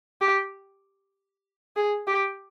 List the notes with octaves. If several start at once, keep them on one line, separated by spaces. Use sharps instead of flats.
G4
G#4
G4